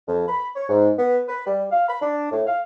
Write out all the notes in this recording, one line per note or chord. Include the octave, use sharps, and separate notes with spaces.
F2
B5
C#5
G#2
B3
B4
G3
F5
B5
D4
A2
F5